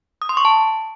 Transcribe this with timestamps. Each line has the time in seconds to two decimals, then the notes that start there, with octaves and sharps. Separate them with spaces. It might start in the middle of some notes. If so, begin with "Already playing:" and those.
0.22 D#6
0.29 C6
0.37 C#6
0.45 A5